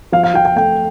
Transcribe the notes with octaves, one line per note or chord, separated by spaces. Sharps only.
F3 F5
F5
F3 G5
G5
A3 G5